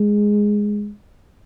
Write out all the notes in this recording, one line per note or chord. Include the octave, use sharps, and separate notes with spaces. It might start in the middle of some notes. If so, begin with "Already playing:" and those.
Already playing: G#3